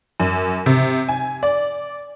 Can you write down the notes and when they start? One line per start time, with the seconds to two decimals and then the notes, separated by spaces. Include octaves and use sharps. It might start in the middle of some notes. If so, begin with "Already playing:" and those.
0.20 F#2
0.66 C3
1.08 G#5
1.43 D5